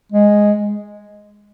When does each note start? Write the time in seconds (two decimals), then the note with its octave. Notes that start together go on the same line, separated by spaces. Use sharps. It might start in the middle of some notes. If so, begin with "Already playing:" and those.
0.12 G#3